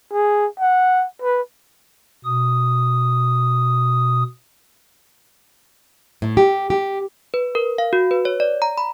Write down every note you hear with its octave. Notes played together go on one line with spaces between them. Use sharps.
G#4
F#5
B4
B2 D#6
A2
G4
G4
B4
A#4
F5
F#4
B4
C#5
D5
A#5
B5